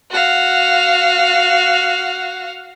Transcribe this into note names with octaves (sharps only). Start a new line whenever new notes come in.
F#4 F5